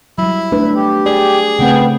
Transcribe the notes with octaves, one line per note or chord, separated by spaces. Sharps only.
F#3 G3 E4
A3 D4 B4
G4
G#4 D5
C#3 A3 B3 C4 G5